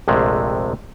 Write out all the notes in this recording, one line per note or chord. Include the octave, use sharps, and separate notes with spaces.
A#1 F2 C3 G#3 A3